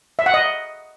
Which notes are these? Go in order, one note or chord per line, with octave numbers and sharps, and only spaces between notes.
E5
F#5
D#5